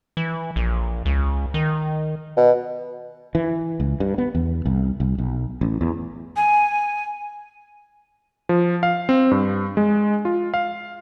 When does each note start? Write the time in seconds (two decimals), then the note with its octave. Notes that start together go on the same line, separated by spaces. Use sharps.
0.17 E3
0.56 A#1
1.05 C#2
1.54 D#3
2.37 B2
3.35 E3
3.80 C#2
4.00 G2
4.18 B3
4.35 E2
4.65 C2
5.00 C2
5.18 B1
5.61 A1
5.81 E2
6.36 G#5
8.49 F3
8.83 F5
9.09 C4
9.31 G2
9.77 G#3
10.25 F4
10.54 F5